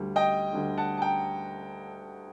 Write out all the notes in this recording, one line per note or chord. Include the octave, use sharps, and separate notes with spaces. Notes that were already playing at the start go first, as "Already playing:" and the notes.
Already playing: D2 D3 G3
D#5 G5
D2 D3 G3
F#5 A5
A5
G5 A#5